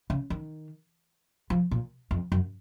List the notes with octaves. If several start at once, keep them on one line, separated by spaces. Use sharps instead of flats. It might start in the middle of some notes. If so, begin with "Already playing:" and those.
C#3
D#3
F3
A#2
F2
F#2